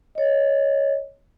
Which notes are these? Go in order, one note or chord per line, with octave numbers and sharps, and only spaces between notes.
C#5 D#5